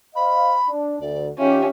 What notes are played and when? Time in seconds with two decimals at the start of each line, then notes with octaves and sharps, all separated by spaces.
0.15 C5 D#5 F5 B5
0.68 D4
1.00 D2 D5
1.38 D#3 C#4 F4 G4 E5